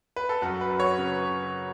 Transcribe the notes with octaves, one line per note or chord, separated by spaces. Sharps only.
B4
A4
F#2 F#4
B4
F#2
C#5
C#3 B4